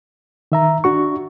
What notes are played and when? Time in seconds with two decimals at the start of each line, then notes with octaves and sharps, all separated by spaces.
0.52 D#3 E5 A#5
0.84 D4 F#4 C#6